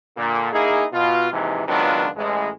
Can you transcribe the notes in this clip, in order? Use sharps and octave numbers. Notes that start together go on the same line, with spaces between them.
A#2 D3
A#3 D#4 E4 G#4
B2 F4
D#2 G#2 C3 E3
C#2 D#3 F#3 B3 D4 F4
A1 G#3